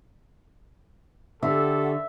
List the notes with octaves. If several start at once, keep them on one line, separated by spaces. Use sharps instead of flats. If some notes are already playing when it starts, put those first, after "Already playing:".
D3 G4 A4 E5 F#5 C#6